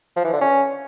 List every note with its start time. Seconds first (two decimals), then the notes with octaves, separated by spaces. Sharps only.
0.17 F3
0.25 E3
0.33 D3
0.41 C#4